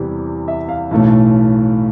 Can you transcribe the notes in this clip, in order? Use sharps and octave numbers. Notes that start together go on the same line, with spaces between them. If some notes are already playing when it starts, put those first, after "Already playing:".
Already playing: E2 C3 E3 G3
E5
F5
B1 A2 E3 A3